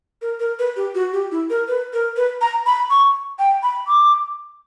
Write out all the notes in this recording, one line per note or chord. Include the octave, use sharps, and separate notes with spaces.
A#4
A#4
B4
G4
F#4
G4
E4
A#4
B4
A#4
B4
A#5
B5
C#6
G5
B5
D6